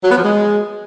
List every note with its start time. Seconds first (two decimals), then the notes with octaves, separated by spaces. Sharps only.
0.04 F#3
0.11 B3
0.17 F3
0.24 G#3